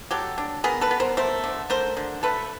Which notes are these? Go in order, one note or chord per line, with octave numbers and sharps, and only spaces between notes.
F#3 G4 A4
D4
B3 G#4 A#4
A4 B4
B3
A#4 C5
A3 A#4 C5
D3
A3 A#4 C5
D3
A3 A4 B4